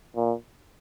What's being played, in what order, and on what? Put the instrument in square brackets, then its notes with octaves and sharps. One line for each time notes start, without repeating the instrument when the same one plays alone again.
[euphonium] A#2